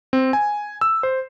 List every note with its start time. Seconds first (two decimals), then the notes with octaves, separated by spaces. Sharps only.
0.13 C4
0.33 G#5
0.81 E6
1.03 C5